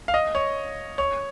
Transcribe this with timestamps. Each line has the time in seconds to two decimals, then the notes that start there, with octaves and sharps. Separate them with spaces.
0.08 F5
0.14 D#5
0.35 C#5
0.98 C#5